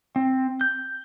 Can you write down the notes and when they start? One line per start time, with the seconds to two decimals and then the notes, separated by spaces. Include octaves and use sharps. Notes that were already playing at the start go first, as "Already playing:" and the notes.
0.16 C4
0.61 G6